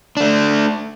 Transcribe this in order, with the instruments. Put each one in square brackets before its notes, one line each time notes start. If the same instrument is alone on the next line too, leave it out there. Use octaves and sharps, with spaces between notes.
[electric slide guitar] A3 D4